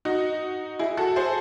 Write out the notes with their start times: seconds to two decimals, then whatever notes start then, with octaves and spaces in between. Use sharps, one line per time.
0.05 D#4 F#4
0.79 E4 G#4
0.97 F#4 A4
1.16 G#4 C5